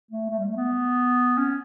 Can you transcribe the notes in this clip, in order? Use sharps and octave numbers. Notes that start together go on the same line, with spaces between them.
A3
A3
G3
A3
B3
C#4